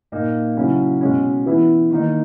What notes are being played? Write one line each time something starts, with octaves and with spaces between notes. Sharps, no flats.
A#2 A#3 D#4
C#3 F#3 C#4 E4
B2 G#3 C#4
E3 B3 E4
D#3 A#3 D#4